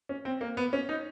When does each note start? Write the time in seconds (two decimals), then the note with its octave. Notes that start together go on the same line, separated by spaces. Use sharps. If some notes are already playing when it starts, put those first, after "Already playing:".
0.09 C#4
0.25 C4
0.41 A#3
0.57 B3
0.73 C#4
0.89 D#4